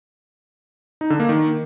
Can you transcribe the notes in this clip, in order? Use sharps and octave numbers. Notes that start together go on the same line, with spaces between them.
D#4
D3
A#3
D#3